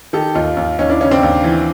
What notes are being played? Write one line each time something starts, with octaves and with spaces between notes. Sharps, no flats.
D#3 G4 A4
D#2 D#4 F4
D#2
D#2 C#4 D#4
D4 E4
C#3 C#4 D#4
C4 D4
D#2
E3